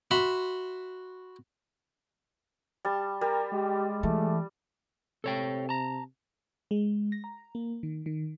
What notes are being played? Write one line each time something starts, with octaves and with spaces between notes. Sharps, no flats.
F#4 E5 B5 C6
G3 A5
G3 A#4
G#3 G4
E3 A3
C3 A4 C#5 G5
A5 A#5
G#3
A#6
A#5
A#3
D#3
D#3